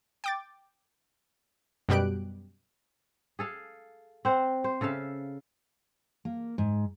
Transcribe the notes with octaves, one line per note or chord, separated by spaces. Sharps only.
G5 D6 A6
F#2 B2 G3 G4 F#6 D7
G#4 A4 F5
C4 C5 F#5
C5
C#3 A4 E5 F5
A#3
G#2